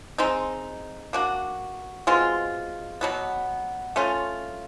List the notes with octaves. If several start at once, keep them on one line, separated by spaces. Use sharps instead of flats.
G#3 C4 D#4
A#3 D4 F#4
B2 G#3 C4 F4
B2 F#3 B3
A3 C#4 F4